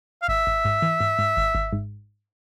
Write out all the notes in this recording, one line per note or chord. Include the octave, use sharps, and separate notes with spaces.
F5
G#1 E5
G#1
G#2
E3
G#2
G#2
G#1
G#1
G#2